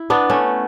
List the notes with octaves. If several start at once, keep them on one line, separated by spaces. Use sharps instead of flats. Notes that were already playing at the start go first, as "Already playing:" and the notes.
Already playing: E4
B3 D4
A3 C#4